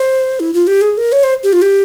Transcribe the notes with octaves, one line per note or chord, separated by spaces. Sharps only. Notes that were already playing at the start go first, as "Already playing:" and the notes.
Already playing: C5
E4
F4
G4
G#4
A#4
C#5
C5
G4
F4
G4